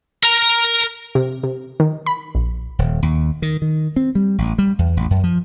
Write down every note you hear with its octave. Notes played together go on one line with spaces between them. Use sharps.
A#4 A#5
C3
C3
D#3
B5
A#1
D#1
D#2
D#3
D#3
C4
G3
A1
G3
E2
A1
F#2
F3